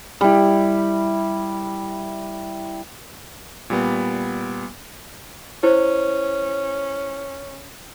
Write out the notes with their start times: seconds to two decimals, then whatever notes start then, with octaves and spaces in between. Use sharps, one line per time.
0.21 G3 E4
3.70 A#2 G3 B3
5.63 C#4 E4 C5